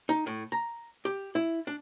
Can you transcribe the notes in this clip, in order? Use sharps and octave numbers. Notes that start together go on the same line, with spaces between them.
D#4
A2
A#5
G4
E4
D4